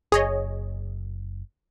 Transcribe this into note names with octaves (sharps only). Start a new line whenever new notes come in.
F#1 G#4 C#5 D#5